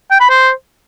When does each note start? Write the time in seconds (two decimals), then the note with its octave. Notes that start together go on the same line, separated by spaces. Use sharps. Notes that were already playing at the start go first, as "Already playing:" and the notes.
0.11 G5
0.21 B5
0.30 C5